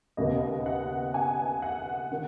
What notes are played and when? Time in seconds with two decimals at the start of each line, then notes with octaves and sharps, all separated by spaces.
0.17 D#2 C#3 B3 D#5
0.66 F#5
1.14 G#5
1.62 F#5
2.12 D#3